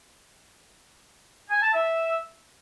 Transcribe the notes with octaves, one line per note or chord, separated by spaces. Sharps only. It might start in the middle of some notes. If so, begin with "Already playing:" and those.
G#5
A5
E5